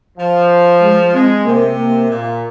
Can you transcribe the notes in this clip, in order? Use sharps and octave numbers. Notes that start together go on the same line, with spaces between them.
F3
G#3
G#3 C4
C3 A#3
A#3
A#2